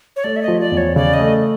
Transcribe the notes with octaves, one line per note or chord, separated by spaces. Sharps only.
C#5
A3 D5
E5
D#5
F3
D5
E2
C#5
C#3 D5
D#5
A3